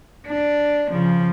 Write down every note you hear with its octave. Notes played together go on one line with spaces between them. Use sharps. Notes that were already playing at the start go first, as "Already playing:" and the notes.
D4
C#3 F3